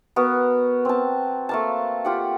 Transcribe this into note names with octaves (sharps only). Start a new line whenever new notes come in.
B3 F#4 A#4
C4 A5
A3 A#3 A5
F4 G4 F#5